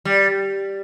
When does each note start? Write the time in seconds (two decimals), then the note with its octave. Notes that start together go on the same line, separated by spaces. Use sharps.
0.05 G3